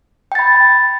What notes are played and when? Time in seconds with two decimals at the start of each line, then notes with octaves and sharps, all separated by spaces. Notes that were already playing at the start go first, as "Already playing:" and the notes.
0.32 G5
0.35 A6
0.39 B5